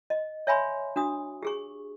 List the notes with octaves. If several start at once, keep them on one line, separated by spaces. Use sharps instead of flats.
D#5
C#5 E5 G#5 B5 C6
D4 F#4 D#6
G4 G#4 C#6